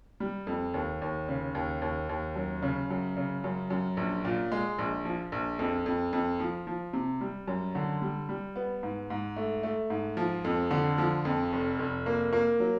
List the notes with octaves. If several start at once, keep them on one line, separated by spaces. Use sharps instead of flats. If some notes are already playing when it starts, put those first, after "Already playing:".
G3
F2
D#2
D#2
C#3
D#2
D#2
D#2
F#2
C#3
F#2
C#3
F#2
F#2
A#1
A#2
G#3
A#1
F3
A#1
F2
F2
F2
F3
F3
C3
G3
F#2
D3
G3
G3
B3
G#2
G#2
A3
A3
G#2
F3
F2
D3
F3
F2
F1
F1
A#3
A#3
F#3